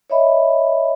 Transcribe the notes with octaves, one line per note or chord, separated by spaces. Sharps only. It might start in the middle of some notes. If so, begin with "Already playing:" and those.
C#5 D#5 E5 B5